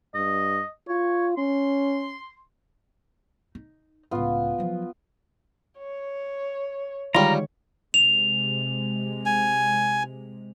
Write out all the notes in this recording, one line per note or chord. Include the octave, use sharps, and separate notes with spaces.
G2 D#5
F4 C#5
C#4 C6
D#4
C#2 A2 B3 F4
F3 F#3
C#5
D3 D#3 G3 G#3 F4 C#5 A#5
C3 G#3 F7
G#5